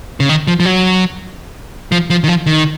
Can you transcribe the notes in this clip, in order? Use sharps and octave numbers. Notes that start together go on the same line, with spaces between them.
C#3
D#3
F3
F3
F#3
F3
F3
D#3
F3
D#3